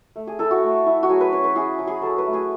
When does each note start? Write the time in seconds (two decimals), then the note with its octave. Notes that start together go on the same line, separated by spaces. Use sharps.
0.16 A3
0.27 G#4
0.39 E4 A4
0.51 F#4
0.63 A3
0.86 E4
1.03 F#4
1.09 F#3 G#4
1.21 B4
1.32 C#4 C#5
1.44 B4
1.55 E4 G#4
1.79 F#3
1.87 G#4
2.02 F#3 A4
2.18 B4
2.26 A3
2.33 G#4